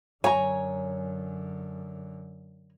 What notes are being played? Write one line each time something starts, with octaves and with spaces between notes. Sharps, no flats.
F#2 D3 C#5 G#5 A#5